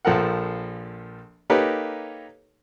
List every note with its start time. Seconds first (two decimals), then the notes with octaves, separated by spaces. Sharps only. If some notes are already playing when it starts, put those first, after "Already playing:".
0.05 A#1 F3 A4 A#4 F#5
1.50 A#3 D#4 G4 A4 B4 C#5